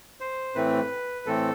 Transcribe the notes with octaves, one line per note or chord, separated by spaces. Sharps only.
C5
A2 E3 A3 C4 B4
A2 E3 A3 C4 A4